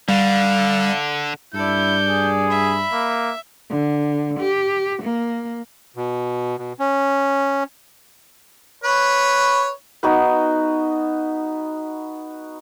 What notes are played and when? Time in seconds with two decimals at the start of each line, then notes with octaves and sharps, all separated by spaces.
0.09 D3 G3 F5
1.54 G2 E4 A4 D5 G6
2.08 G#4
2.50 E5 B5
2.93 A#3
3.70 D3
4.40 G4
5.03 A#3
5.96 B2
6.58 B2
6.80 C#4
8.84 B4 C#5
10.03 B3 D#4 F#4 B4